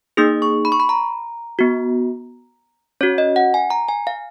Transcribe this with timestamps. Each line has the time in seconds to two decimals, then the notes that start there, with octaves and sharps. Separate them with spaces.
0.17 A#3 D#4 G#4 D#6
0.42 C#6
0.65 B5
0.72 C#6
0.80 B5
0.89 A#5
1.59 B3 F#4
3.01 C#4 F#4 C#5
3.18 D#5
3.36 F#5
3.54 G#5
3.70 A#5
3.88 G#5
4.07 F5